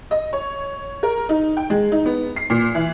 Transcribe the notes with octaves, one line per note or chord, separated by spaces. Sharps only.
D#5
C#5
A#4
D#4
G5
G#3
D#4
B3
C7
A#2
E3